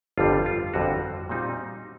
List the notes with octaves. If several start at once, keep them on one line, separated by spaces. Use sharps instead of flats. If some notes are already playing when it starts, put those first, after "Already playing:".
G1 F2 D3 G3 F4
F4
G1 F2 D3 G3 F#4
A#2 G3 C4 D#4